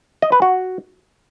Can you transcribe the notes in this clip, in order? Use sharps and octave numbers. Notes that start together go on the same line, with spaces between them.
D#5
B4
F#4